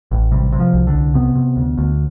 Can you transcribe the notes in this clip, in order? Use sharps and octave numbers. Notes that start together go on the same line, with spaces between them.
A1
C3 G3
C3
F3
C2
D3
C2
C3 B3
C3
D2
D2